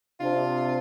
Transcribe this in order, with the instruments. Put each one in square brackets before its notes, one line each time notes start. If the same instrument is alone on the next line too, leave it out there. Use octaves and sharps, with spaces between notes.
[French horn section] C3 D4 [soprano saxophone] F4